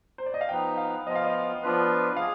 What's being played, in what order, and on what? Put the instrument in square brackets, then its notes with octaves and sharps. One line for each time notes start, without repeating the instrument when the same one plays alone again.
[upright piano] C5
D5
D#5
F5
[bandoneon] F3 B3 D#4 B4 [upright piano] G5
[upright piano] F5
[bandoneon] F3 B3 F4 [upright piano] D#5
[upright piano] F5
D#5
[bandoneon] F3 B3 D4 F4 B4
[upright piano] F5
[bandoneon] G#4